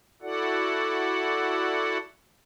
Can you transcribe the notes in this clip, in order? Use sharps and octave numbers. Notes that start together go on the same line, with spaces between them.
E4 F#4 A4 D5 F#5